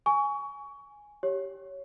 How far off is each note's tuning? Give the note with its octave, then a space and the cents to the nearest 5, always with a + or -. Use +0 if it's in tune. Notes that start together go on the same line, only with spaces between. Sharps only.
G#5 +0 C#6 +25
G4 -10 C#5 +0